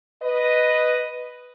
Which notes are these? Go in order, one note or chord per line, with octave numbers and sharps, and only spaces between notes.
B4 D#5